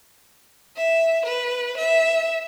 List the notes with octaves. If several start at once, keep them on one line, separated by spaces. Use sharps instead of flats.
E5
B4
E5